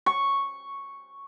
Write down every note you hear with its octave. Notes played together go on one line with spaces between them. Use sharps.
C#6